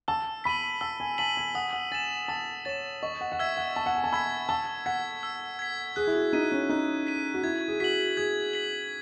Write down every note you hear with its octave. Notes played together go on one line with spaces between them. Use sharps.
A5 E6
B5 B6 D#7 F#7
A5 E6
G#5
A5 B6 D#7 F#7
G#5
F#5 D#6
F#5
G#5 A6 E7
A5 D#6
C#5 A6 E7
D#5 C#6
F#5
F#5
E5 E6 G#6 B6
F#5
A5 C#6
F#5
G#5
A5
B5 E6 G#6 B6
A5 E6
F#5 G#6 B6
E6
G#6 B6
G#4 F#6
E4
F#4
D#4 B6 D#7
C#4
D#4 F#6
B6 D#7
F#4
E4 G#6
G#4
F#4 B6 F#7
G#4 G#6
B6 F#7